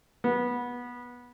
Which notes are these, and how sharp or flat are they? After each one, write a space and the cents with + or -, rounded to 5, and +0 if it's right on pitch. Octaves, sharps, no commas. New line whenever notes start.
B3 -20